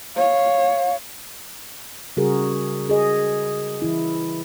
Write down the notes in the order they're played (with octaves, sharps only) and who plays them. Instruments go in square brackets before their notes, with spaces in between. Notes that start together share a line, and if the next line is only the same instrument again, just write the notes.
[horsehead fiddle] C#5 [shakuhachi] F5
[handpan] C#3 G3 F#4 G#4 A#4
G#4 D#5
E3 E4